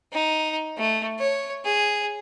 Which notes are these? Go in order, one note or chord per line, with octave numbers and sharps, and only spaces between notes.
D#4
A3
C#5
G#4